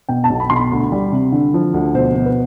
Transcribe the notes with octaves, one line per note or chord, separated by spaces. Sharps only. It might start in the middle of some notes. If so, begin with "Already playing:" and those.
B2 G5
A5
B1
B5
B1 C6
B5
D2
G3
C3
D3
F3
D2
B2 C5
B2
B4